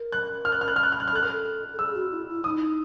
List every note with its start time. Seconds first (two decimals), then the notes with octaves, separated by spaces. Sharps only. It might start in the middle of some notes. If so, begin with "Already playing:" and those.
Already playing: A#4
0.12 F#6
0.45 F6
0.52 F#6
0.61 F6
0.68 F#6
0.76 F6
0.83 F#6
0.92 F6
1.00 F#6
1.08 F6
1.12 A4 F#6
1.22 A#4 F6
1.31 A4
1.73 A4
1.79 G#4 E6
1.95 F#4
2.11 E4
2.29 E4
2.44 D#4 D#6